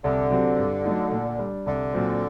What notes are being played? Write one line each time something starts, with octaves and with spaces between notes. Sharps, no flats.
C2 D3
C3 F#3 C4
G2
F#3 A3 D#4
A#2
G3 D4
C2 D3
A#2 F#3 C4